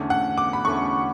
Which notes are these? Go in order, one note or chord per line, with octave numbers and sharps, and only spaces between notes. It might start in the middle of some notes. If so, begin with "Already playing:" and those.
Already playing: E2 D3 A3 C#4
F#5
D6
B5
E2 D3 A3 C#4 C#6